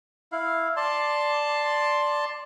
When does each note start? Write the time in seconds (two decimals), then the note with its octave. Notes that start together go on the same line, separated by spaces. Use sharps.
0.32 E4 F5
0.77 D5 A5 C6